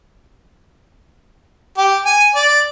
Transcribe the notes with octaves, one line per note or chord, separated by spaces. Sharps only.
G4
G#5
D5